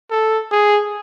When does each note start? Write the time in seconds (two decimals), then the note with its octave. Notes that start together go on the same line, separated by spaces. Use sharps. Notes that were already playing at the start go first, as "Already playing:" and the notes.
0.11 A4
0.52 G#4